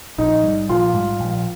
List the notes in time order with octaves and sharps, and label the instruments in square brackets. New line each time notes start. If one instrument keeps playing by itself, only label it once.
[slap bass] A#1 [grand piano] D#4
[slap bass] G#2 G3
[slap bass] A#1 [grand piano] F4
[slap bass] G#2 G3
A#1